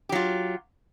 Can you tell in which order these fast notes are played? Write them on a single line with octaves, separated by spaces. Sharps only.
G4 F#3 F4